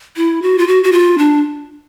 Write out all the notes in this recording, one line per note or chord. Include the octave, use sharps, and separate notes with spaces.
E4
F#4
F4
F#4
F#4
F4
D4